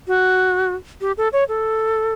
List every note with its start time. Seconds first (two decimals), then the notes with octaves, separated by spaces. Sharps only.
0.07 F#4
1.01 G4
1.17 A4
1.33 C#5
1.48 A4